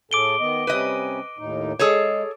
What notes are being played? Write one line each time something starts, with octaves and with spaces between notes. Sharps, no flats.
A2 G#4 A4 D6 D7 G7
D#3 B3 D#5
C3 G3 C#4 B4 D#5
D#2 A2 D#4
G#3 G#4 A4 C#5